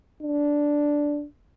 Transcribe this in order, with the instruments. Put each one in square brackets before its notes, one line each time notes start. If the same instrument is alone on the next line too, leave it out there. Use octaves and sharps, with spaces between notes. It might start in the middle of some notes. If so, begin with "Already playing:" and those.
[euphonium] D4